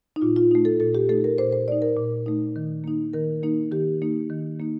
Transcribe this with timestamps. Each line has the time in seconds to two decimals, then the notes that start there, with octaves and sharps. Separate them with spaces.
0.16 D#4
0.22 A#2 F4
0.37 F4
0.51 A3 D#4
0.65 A4
0.80 A#2 A4
0.95 G4
1.09 A3 D#4 A4
1.24 A#4
1.38 A#2 C5
1.53 C5
1.68 A3 D#4 D5
1.82 A#4
1.97 A#2
2.26 A3 D#4
2.56 D#3
2.84 A#3 D#4
3.13 D#3 A#4
3.43 A#3 D#4
3.72 D#3 G4
4.02 A#3 D#4
4.30 D#3
4.60 A#3 D#4